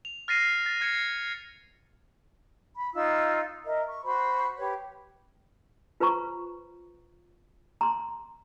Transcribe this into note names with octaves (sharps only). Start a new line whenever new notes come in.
F7
F6 A6 A#6 C7 D#7
A6
F6 G#6 C7 C#7 D#7
B5
D#4 F4 E6
A#4 D#5 E5
C#6
F#4 C5 B5 C#6
G4 B4 C#5
F4 B4 C5 A#5 C#6
A#5 C6